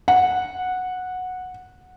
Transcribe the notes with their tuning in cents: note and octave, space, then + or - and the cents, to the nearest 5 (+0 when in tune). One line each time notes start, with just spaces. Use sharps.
F#5 -10